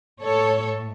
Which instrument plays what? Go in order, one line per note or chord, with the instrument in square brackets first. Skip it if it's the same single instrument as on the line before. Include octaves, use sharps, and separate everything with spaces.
[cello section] A2 A4 C#5